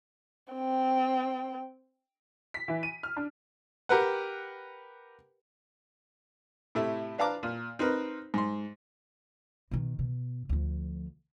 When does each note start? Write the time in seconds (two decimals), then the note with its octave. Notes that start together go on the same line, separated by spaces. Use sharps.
0.53 C4 G5
2.54 B6
2.68 E3
2.83 D#7
3.03 F6
3.17 D4
3.89 G4 A#4 B4 F#5
6.75 A2 C3 A3 E4
7.18 D4 B4 F5 A5 A#5 D6
7.43 A#2
7.79 C4 D#4 A#4 B4
8.34 G#2 C6
9.71 B2 D#3
9.99 B2
10.49 D2 F3